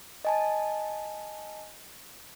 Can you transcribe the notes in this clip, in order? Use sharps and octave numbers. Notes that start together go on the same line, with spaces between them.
D#5 G#5 A5